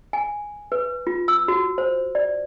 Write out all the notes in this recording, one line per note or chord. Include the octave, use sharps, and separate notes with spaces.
G#5
B4
F4
E6
F#4
C5
D5